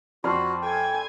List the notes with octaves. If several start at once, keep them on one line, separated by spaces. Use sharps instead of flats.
F2 F#4 C5 D5 B5 F6
A4 G5 G#5